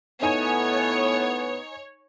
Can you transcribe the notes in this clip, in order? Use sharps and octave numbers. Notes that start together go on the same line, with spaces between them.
A2 B3 D#4 C#5 G#5 D#7